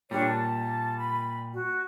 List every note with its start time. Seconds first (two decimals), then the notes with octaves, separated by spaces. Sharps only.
0.11 A#2 G3 D4 G4 C#5
0.26 A5
0.99 B5
1.54 F#4